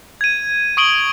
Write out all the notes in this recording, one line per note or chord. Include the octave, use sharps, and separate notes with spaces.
G#6 D#7
C#6 D#6 D7 F#7 G7